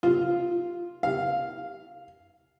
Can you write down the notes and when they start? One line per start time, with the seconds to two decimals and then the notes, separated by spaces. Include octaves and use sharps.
0.03 F4
1.03 F5